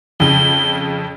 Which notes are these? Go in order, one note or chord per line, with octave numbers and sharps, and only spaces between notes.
F2 C#3 G7